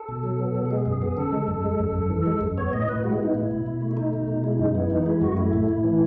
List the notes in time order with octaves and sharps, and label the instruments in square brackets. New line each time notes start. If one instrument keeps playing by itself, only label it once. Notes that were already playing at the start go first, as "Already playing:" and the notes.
Already playing: [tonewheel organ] A4
B2
F#3
B3
B2
A4
G#3 G#4
F#2 G#4
B3 G#4
C#3 A4
G#3
F#2
G#3
F#2
F#2
E3
G#3
F#2
B3 C#5
A2 D#5
A2 B4
G#3 F#4
E4
B3 D#4
A2 E4
B2
B2
A3
E4
A3 D#4
B2
B2
G#3 E4
F#2 D#4
B3 E4
E3 D#4
G#3 E4
F#2 F#4
A3 E4
A2
A2
E3